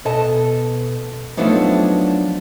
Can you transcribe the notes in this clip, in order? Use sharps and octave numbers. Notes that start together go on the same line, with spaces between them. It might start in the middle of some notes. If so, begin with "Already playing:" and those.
B2 B3 A4 D#5 A5
F3 F#3 A3 B3 D4 D#4